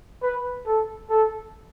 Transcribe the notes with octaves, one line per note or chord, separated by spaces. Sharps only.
B4
A4
A4